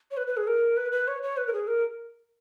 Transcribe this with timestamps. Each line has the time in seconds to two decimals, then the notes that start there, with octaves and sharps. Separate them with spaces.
0.11 C#5
0.17 B4
0.27 B4
0.37 G#4
0.47 A#4
0.77 B4
0.92 B4
1.07 C#5
1.22 C#5
1.37 B4
1.47 A#4
1.53 G#4
1.67 A#4